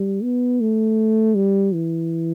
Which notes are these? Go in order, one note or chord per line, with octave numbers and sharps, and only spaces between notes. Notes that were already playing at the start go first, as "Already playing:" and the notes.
Already playing: G3
B3
A3
G3
E3